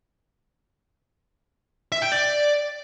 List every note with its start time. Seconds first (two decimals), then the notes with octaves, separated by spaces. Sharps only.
1.92 E5
2.02 G5
2.12 D5